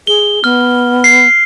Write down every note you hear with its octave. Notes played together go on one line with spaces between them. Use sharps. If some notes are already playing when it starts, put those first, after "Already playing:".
G#4 G7
B3 F6
C7